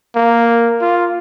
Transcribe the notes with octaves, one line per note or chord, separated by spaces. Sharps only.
A#3
F4